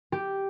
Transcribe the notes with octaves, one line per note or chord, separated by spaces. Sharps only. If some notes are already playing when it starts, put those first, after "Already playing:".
G4